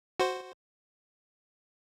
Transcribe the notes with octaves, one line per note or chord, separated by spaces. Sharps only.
F#4 C5